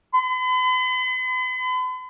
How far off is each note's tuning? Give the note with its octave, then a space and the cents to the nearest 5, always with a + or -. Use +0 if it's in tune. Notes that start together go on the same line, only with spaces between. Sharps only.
B5 +45